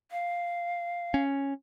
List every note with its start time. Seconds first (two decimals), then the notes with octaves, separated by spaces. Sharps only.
0.12 F5
1.14 C#4